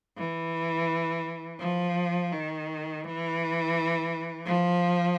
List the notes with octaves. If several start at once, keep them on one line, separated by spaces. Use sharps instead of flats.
E3
F3
D#3
E3
F3